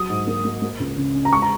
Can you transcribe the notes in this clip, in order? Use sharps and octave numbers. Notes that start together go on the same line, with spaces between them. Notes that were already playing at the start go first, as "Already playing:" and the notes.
Already playing: F#3 D#6
G#2
A#3
A#3
A#3
C#2
C#3
C#4
A#5
G#3 C#6
A#5